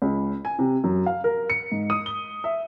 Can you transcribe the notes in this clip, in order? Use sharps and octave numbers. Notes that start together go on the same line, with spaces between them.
C#2
G#5
C3
F#2
F5
A#4
C#7
G#2
D#6
G7
E5